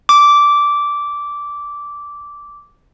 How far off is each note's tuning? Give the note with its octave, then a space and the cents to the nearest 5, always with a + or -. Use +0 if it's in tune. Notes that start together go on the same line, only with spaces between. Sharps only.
D6 -10